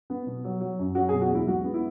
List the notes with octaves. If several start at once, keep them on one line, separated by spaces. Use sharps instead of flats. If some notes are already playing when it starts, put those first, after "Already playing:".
B3
B2
F#3
F#3
F#2
F#3 F#4
G#4
B2
F#4
E2 E4
G#2 F#4
B3
E4